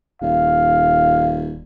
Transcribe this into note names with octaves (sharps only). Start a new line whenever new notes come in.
D#1 F5